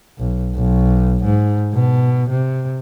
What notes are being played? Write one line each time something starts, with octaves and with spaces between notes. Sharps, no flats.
B1
B1
G#2
B2
C3